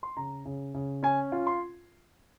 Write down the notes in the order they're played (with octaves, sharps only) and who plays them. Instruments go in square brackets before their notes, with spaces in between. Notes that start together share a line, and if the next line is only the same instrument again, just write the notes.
[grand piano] C6
C#3 A#5
C#3
C#3
C#4 G#5
F4
C6